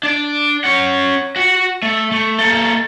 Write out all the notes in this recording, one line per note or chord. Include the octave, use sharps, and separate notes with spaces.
D4 D5
C#4 F#5
F#4 F#5
A3
A3
A#3 A4